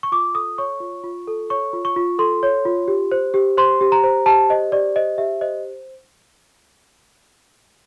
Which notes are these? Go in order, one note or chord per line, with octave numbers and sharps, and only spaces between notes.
C#6
F4 D6
A4 D#6
C#5 C#6
F4
F4
A4
C#5 C#6
F4
C#6
F4
A4 C6
C#5
F4
G4
C5
G4
C5 C6
G4
A#5
C5
G4 A5
C5 D#5
G4 D5
C5 D#5
G4 E5
C5 D#5